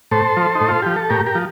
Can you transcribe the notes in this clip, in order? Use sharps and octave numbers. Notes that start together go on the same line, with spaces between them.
A2 A4 C5
F3
D#4
A2
F4
F3 G4
A4
A2 G4 A#4
G4 A#4
F3